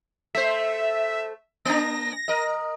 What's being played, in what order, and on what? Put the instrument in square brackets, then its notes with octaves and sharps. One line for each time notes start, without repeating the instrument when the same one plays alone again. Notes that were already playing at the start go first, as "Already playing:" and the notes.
[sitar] A3 C5 [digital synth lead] E5
[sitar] A#3 D4 [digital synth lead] A#6
[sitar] A#4 D#5